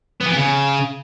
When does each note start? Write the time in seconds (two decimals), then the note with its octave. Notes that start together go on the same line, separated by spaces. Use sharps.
0.21 B3
0.26 E3
0.31 B3
0.37 C#3